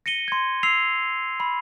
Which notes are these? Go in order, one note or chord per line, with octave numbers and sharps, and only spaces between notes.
A#6 C#7 D#7 G7
C6 G#6
E6 C7 F7
B5